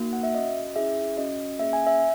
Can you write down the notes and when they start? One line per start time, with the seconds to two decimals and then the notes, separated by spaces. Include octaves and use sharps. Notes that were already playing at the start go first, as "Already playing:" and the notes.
Already playing: A#3 D#4 F#4
0.13 F#5
0.23 E5
0.35 C#4 F#4 D#5
0.76 C#4 E4 G#4 E5
1.18 C#4 F#4 D#5
1.59 A#3 C#4 G#4 E5
1.73 G#5
1.87 E5